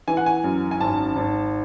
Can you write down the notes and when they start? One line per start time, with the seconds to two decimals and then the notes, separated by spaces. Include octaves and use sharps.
0.08 E3 G#5
0.17 F#5
0.26 G#5
0.44 F#2
0.71 G#5
0.80 G#1 A5
1.16 G#1